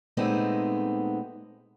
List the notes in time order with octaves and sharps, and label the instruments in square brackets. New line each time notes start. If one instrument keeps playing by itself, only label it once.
[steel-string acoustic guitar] A#2 G#3 A3 B3 C4 D#4